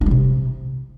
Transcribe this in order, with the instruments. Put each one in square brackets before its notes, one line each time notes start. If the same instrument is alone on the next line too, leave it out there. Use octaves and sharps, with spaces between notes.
[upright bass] D4
G3
C3